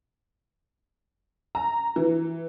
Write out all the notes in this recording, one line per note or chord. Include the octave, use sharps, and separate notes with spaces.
A#5
E3